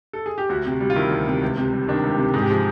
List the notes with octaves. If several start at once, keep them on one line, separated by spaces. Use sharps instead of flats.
A4
G#4
G4
D2 F#4
C3
G3
F4
D#3 E4
D2
C3
C#2
C3
G3
D#3 D4
C#2
G4
C3
G#2 G#4
G4
F3 G#4